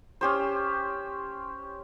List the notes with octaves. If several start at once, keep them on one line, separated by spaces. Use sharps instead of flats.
C#4 G4 C5